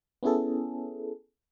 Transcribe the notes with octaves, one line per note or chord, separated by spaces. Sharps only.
B3 C#4 E4 G#4 A4